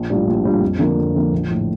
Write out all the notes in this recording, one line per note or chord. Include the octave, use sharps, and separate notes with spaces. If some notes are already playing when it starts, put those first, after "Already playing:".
Already playing: A#1
A2 G3 D4 F4
A#1
A2 G3 D4 F4
F2
D3 F3 A#3
F2
D3 F3 A#3
A#1
A2 F3